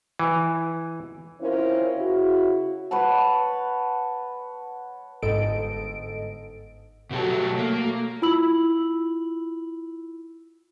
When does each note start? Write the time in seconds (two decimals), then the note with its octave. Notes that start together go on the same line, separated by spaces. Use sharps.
0.19 E3
1.41 C4 C#4 E4 F4 A#4
1.96 C#3 E4 F#4
2.91 B4 C#5 F#5 A5
5.22 G1 G#2 A4 D#5 D7
7.11 B2 F#3 A3 G4 A4
7.58 A#3
8.22 E4 F4 B5 E6 F#7